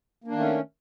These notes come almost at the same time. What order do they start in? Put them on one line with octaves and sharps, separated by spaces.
A#3 D4 D#3 A3 C#4